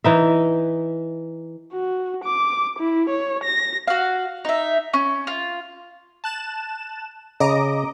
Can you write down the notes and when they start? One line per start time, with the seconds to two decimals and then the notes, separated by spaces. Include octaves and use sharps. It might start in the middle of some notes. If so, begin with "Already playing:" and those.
0.04 E3 D#4 E5
1.73 F#4
2.24 D6
2.80 E4
3.10 C#5
3.44 A#6
3.88 F#4 F5
4.45 D#4 E5
4.94 C#4
5.27 F4
6.24 A5 F#6 E7
7.40 C#3 D#5 A#5 D6